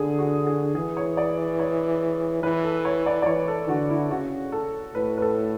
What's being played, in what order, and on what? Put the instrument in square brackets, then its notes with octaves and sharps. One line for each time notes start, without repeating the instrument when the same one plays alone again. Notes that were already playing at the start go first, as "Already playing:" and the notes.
Already playing: [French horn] D3 [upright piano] G#4
[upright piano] F#4
G#4
[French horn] E3 [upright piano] G#4
[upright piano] C#5
D5
C#5
[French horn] E3 [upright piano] B4
[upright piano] A4
C#5
D5
D5
[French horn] E3 [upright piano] C#5
[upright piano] A4
[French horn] D3 [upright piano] F#4
[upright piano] E4
[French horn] C#3 [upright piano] F#4
[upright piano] A4
[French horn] A2 [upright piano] B4
[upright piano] B4
A4